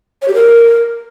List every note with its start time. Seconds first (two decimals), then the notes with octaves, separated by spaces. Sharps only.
0.22 C#5
0.28 G4
0.34 A#4